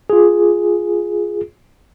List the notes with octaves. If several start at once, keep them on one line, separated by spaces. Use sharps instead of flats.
F4 G#4